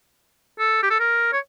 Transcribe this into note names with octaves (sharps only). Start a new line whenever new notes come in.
A4
G4
A4
A#4
C#5